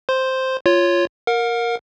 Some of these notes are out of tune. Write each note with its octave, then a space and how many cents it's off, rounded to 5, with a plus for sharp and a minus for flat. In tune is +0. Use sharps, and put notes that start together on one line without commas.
C5 +0 C6 +0
F4 -5 C#5 +0
A#4 +0 F#5 -45